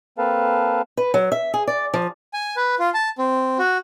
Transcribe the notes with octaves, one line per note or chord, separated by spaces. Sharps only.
A#3 C4 A4 B4 F5 A5
B4
F#3
E5
G#4
D5
F3
G#5
B4
F4
A5
C4
F#4